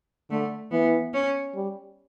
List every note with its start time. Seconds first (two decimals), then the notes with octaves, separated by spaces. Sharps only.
0.31 D3 A3
0.71 E3 B3
1.13 C#4
1.55 G3